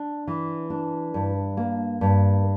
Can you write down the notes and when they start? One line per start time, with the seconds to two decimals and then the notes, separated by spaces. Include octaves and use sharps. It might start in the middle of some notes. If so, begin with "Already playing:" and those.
Already playing: D4
0.27 E3
0.70 D4
1.14 G2
1.57 A#3
2.01 G2